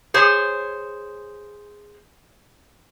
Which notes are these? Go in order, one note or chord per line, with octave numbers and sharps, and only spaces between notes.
G#4 C5 C#5